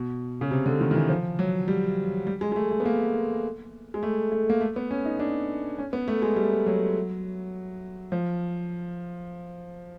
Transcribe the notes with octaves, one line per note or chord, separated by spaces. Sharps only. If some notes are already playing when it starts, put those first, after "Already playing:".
Already playing: B2
C#3
C3
D3
D#3
D#3
E3
F3
F#3
G3
G3
G#3
G#3
A3
A3
B3
A#3
G#3
A3
A3
A#3
A3
B3
C#4
D#4
D4
C#4
B3
A3
G#3
G3
F#3
F3